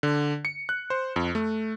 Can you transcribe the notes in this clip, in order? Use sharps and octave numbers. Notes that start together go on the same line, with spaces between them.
D3
C#7
F#6
C5
F2
A3